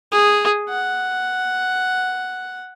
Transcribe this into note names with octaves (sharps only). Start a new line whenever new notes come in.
G#4
F#5